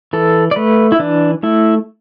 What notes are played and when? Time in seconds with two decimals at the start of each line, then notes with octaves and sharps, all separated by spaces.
0.13 E3 A4
0.51 D5
0.56 A3 B4
0.92 E4
0.99 E3 D4
1.43 A3 E4